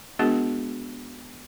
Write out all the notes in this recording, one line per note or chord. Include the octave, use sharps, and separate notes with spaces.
G#3 B3 D4 F#4 G#4 A#4